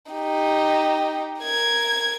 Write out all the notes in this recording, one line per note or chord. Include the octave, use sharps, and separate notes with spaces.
D#4 G4
A#4 G#6